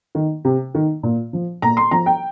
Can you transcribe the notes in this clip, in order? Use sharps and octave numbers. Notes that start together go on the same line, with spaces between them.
D#3
C3
D#3
A#2
F3
A#2 A#5
C6
F3 A#5
G5